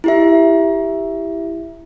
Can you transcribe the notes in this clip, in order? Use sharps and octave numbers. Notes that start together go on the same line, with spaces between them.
E4 G4 E5